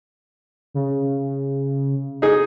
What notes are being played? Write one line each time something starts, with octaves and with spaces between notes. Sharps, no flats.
C#3
D#4 G#4